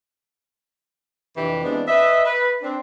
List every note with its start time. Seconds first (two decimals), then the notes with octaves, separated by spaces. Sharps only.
1.37 F2 C3 E3 D4 G4
1.64 E3 G#3 B3 C4 D4
1.88 B4 D#5 E5
2.25 B4
2.62 C4 D4